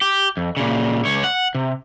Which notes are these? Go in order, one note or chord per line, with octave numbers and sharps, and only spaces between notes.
G4
F2
A#2 C#3
C#2 C#5
F#5
C3